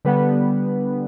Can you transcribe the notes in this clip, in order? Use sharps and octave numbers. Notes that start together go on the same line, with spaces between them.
D3 G3 B3 B4